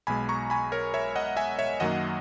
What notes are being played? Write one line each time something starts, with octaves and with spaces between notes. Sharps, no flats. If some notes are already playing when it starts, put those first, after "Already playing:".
B1 B2 G#3 G#5 B5
A#5 C#6
G#5 B5
A#4 C#5
C#5 E5
D#5 F#5
E5 G#5
C#5 E5
F#2 D#3 F#3 A#3 D#5 F#5